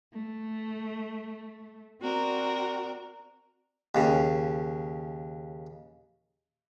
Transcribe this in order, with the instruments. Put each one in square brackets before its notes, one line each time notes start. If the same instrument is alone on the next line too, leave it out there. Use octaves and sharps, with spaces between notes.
[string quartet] A3
C4 F#4 A#4 D5
[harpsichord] D#2 C#3